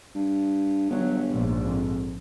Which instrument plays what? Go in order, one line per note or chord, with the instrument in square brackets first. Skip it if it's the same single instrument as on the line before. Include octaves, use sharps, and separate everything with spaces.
[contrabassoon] G2
[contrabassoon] G1 [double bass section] F#3
[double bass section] A#1 G#2
[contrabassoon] F2